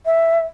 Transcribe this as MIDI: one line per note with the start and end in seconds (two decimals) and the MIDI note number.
0.05 0.41 76